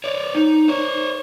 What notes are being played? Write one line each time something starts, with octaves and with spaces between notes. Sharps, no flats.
C#5 D5
D#4
C5 C#5